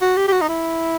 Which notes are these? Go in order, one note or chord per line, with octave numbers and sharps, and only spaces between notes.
F#4
G4
G4
F#4
D#4
E4